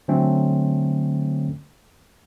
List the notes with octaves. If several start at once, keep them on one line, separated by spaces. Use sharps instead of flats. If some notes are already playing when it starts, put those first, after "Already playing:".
D3 F#3 A3 C4 C#4